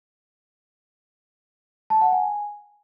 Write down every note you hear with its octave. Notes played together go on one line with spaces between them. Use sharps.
A5
F#5
G#5